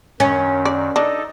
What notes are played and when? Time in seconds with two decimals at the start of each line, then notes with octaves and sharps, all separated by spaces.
0.20 F#2 D#3 C#4
0.65 D5
0.96 D4 D#4 A4 D#5